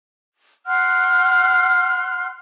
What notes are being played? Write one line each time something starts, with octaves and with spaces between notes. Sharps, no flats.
F#5 C6 F6 F#6